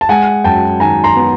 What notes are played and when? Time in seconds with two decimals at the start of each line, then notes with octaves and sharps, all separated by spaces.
0.01 A5
0.09 G#3 F#5 G#5
0.44 F#2 G5 A5
0.80 D#3 G#5 A#5
1.04 A#5 C6
1.16 B3